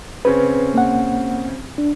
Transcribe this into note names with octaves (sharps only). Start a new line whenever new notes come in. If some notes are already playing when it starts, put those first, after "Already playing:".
C#3 C4 C#4 B4
A#3 F#5
D4